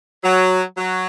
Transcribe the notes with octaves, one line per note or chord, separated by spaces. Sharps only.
F#3
F#3